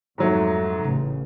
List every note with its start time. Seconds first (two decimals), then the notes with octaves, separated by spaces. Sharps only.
0.18 F2 G#2 F#3 A3
0.82 A1 C#3